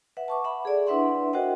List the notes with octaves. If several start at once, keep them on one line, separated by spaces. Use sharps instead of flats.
B4 E5 F#5
A5 C#6 D6
E5 F#5 B5
G#4 A4 D5
D4 E4 B4 E5 F#5 C6
F#4 A#4 C5 D#5 F#5 G5